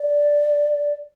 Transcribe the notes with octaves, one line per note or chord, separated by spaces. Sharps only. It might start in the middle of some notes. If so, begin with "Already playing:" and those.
Already playing: D5